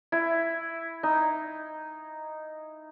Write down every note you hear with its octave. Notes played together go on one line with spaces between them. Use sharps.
E4
D#4